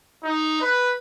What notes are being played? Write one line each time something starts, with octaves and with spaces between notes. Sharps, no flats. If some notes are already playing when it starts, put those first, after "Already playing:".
D#4
B4